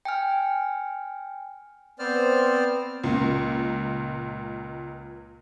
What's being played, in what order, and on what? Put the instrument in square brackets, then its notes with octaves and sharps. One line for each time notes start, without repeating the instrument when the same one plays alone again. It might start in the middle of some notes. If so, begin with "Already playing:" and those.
[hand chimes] G5 G#5 F6
[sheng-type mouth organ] B3 C4 C5 D5 F6
[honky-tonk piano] C#2 A#2